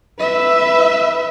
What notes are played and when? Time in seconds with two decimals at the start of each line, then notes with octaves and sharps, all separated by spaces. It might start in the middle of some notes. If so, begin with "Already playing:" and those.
0.20 B4 E5